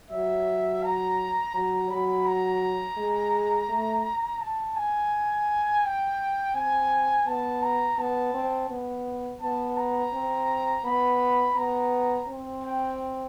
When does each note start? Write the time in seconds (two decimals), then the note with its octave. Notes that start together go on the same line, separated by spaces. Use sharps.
0.11 F#3 E5
0.83 A#5
1.54 F#3 A#5
1.90 F#3 B5
2.26 A#5
2.98 G#3
3.69 A3
4.41 A5
4.76 G#5
5.84 G5
6.54 C4 G#5
7.27 B3 A5
7.63 A#5
7.98 B3 A5
8.34 C4
8.70 B3
9.41 B3 A5
9.77 A#5
10.13 C4
10.84 B3 B5
11.56 B3 A#5
12.27 C4
12.64 G5